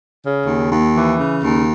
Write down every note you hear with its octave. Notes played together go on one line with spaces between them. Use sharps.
C#3
D#2
D#2
E3
C#3
D#2